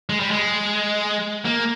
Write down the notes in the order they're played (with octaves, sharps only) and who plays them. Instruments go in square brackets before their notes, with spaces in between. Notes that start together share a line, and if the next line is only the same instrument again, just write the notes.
[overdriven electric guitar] G#3
G3
G#3
A#3